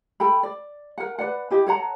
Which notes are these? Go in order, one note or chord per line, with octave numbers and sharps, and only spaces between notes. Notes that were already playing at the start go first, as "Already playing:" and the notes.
A4 G5 B5
D5
A#4 F#5
B4 D5 F#5
E4 G4 D#5
A4 C#5 F#5 A#5